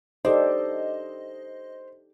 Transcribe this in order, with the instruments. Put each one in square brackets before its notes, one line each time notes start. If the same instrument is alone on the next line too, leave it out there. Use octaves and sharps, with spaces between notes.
[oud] D4 [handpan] D#4 G4 A4 [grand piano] C5 [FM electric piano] D#5